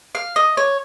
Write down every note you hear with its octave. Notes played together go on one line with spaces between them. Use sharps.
F5
D#5
C#5